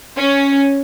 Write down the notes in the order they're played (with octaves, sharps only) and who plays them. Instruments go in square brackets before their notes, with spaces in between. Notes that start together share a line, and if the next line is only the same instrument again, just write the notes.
[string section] C#4